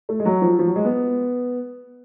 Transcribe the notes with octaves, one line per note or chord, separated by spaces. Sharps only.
A3
G#3
F#3
F3
F3
F#3
G#3
B3